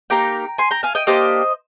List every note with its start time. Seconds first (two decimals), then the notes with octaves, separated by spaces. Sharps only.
0.10 A#3 D#4 G4 G5 A#5
0.58 G#5 C6
0.71 G5 A#5
0.83 F5 G#5
0.95 D#5 G5
1.07 A#3 D4 G4 C5 D#5